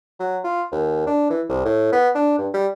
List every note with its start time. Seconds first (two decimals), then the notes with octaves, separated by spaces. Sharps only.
0.20 F#3
0.44 F4
0.72 D#2
1.07 D4
1.30 E3
1.49 C2
1.65 A2
1.93 B3
2.15 D4
2.38 G2
2.54 G3